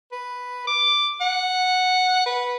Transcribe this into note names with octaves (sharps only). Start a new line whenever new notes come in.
B4
D6
F#5
B4